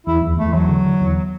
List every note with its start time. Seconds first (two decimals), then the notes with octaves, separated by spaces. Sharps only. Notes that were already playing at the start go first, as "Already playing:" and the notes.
0.06 E2 E4
0.22 E2
0.38 E2 A3
0.54 E2 F#3
0.69 D3
0.85 D3
1.01 E2